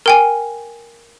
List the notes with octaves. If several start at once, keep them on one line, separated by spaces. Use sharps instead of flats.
A#4 G5 G#5